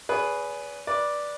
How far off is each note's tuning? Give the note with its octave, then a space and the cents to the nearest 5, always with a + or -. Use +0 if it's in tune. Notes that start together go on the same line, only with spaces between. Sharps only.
G#4 +5 B4 +0 D5 -40
B4 -20 D5 +0